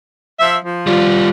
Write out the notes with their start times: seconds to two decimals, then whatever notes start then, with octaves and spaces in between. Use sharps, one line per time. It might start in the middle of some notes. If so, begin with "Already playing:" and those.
0.40 F3 E5
0.64 F3
0.87 G3 F4